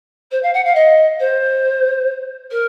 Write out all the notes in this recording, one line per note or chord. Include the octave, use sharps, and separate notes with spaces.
C5
F5
F#5
F5
D#5
C5
A#4